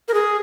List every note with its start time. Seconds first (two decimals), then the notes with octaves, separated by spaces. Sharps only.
0.08 A#4
0.14 G#4